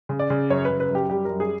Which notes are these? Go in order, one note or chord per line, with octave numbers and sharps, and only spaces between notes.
C#3
D5
C#3
F#2 C#5
B4
C#3
B4
F#2
G4
G3 G4
F#2 A#4
G#4